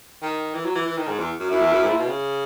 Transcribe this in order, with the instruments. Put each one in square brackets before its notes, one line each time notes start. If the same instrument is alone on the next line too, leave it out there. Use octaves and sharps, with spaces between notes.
[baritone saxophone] D#3
E3
F#3
E3
E3
D#3
G#2
E2
F#2
[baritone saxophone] F#2 [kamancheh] E4
[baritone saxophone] E2
F#2
G#2
A#2
B2
C#3